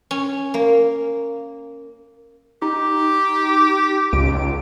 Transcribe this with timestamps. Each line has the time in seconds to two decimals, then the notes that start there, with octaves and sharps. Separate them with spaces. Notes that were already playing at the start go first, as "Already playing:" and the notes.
0.11 C#4
0.54 A#3
2.62 D#4 G4
4.13 C#2 D7